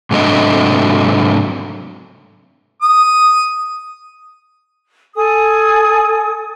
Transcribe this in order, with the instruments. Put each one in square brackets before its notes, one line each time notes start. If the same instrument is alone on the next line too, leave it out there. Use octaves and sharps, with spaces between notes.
[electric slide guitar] G#2 C3 F#3 A3 D4 D#5
[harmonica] D#6
[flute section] A4 G#5 D#6